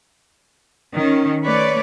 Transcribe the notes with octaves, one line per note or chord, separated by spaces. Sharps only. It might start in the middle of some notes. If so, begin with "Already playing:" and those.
D#3 C#4
A3 B4 C#5 D5